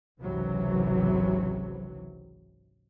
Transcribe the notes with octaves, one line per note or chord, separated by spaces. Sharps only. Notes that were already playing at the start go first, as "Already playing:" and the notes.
G#1 C#2 C3 E3 F#3